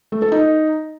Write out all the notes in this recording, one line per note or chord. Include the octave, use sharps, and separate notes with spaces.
A3
A4
D#4